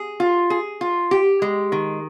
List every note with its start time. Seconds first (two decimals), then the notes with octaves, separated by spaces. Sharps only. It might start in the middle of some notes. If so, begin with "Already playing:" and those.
Already playing: G#4
0.20 F4
0.50 G#4
0.81 F4
1.11 G4
1.42 G#3
1.72 D#3